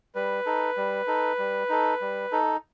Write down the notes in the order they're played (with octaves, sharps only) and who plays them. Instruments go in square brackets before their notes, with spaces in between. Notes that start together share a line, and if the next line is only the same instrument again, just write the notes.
[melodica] G3 [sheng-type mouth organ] B4
[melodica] D#4 A4
G3
D#4 A4
G3
D#4 A4
G3
D#4 A4